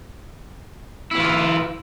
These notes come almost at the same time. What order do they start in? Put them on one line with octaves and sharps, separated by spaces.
E4 E3 F4